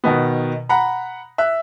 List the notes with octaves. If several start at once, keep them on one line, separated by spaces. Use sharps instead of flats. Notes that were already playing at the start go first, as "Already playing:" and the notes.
B2 D#3 B3
F#5 A#5 B5
E5 F#6